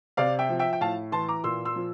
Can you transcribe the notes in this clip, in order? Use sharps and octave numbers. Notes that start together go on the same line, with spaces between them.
C3 D5 F5
E5 G5
F3
E5 G5
G5
A2 F5 A5
E3 A5 C6
A#5 D6
A#2 C6 E6
C6 E6
F3